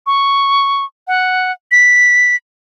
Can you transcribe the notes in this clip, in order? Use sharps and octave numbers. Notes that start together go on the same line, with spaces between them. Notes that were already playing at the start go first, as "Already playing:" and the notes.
C#6
F#5
B6